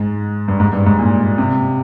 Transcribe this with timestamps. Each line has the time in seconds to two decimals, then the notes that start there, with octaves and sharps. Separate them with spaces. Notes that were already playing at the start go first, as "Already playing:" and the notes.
Already playing: G#2
0.48 G2
0.60 G#2
0.73 G2
0.86 G#2
0.99 A#2
1.38 C3